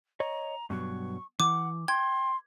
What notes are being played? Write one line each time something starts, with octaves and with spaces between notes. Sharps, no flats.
C#5 D#5 A#5
G2 B2 F#3 C#6
E3 F#5 D6
G5 C6 G#6